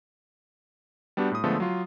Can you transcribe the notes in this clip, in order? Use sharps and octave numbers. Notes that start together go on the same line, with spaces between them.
G3 B3 D4 F#4 G4
A2 D#6
D3 F3 G#3 A3 B3 A4
F#3 F4